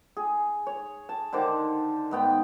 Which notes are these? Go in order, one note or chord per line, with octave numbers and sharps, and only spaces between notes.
G#4
C#5
A5
D3 D#3 C5 D6
G#2 B3 G5